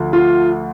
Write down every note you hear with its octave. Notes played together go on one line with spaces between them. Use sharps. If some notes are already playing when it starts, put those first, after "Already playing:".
Already playing: D2 D3 F3
F4